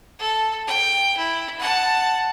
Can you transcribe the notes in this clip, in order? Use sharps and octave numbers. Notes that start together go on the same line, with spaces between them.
A4
G5
E4
F#5 A5